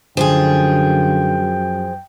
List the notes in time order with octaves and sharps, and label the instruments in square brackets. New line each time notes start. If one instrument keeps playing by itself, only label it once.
[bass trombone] F#2 [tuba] D3 [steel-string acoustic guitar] F3 F4 G#4 [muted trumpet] G5